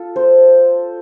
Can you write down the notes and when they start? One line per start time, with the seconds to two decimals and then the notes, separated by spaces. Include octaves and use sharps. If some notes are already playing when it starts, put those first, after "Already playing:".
Already playing: F4 A4
0.16 C5